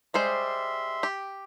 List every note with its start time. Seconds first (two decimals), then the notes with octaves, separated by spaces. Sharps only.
0.14 G3 G#3 C5 E5 C6
1.03 G4